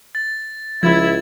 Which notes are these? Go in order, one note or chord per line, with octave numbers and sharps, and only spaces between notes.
A6
C#2 F3 E4 F4 G#6